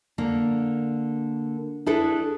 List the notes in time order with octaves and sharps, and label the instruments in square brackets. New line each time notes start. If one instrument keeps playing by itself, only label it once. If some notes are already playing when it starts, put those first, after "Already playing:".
[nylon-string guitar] D3 A#3 D4
D4 E4 G#4 A4 B4 E5